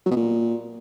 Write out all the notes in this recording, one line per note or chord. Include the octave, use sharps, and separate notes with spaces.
F#3
B2
A#2